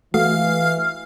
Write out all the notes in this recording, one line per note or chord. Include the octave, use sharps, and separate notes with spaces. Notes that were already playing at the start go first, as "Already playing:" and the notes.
E3 A3 F#4 F5 F6